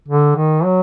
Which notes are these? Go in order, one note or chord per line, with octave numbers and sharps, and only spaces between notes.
D3
D#3
F#3